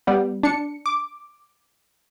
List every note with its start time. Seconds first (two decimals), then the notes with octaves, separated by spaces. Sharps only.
0.07 G3 B3
0.43 D4 C#7
0.86 D6